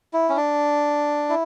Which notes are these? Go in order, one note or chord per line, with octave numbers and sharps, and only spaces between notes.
E4
C#4
D4
E4